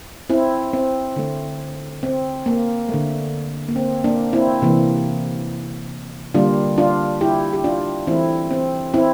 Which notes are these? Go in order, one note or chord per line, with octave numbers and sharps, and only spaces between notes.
C4 E4
C4
D3 A3
C4
A#3
D3 A3
A#3
C4
A#3 D4
C4 E4
C3 E3 A#3
D3 G3 A#3 D4 F4
D4 F4
E4 G4
G4
D4 F4
E3 A3 C4 E4
C4
C4 E4